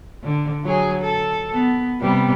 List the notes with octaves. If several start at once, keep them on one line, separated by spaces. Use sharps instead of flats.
D3
F#3 G#4
A4
B3
C3 G3 B3